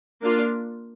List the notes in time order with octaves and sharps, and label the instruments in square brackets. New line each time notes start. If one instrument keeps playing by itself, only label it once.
[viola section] A#3 D4 F4